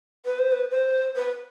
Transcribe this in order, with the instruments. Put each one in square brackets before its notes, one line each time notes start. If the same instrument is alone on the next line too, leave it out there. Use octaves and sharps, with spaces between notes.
[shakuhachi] B4
C5
B4
C5
B4